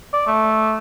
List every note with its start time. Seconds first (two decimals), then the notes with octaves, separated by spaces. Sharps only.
0.13 D5
0.27 A3